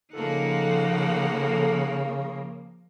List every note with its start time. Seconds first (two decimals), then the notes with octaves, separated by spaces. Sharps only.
0.13 C#3 F3 A#3 D#4 A4 F#5